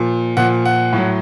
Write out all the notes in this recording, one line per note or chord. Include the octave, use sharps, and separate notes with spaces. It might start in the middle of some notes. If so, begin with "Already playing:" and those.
Already playing: A#2 F3
A#2 F3 F#5
F#5
A2 F#3